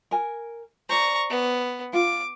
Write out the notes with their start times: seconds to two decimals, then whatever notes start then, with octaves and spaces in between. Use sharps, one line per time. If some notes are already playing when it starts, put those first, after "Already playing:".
0.11 A#4 G#5
0.89 C5 D5 A#5 C#6
1.30 B3
1.93 F4 D6